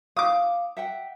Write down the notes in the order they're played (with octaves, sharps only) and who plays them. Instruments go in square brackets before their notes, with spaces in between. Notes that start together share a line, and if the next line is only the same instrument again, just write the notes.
[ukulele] F5 [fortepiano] D6 D#6
[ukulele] E5 F#5 G5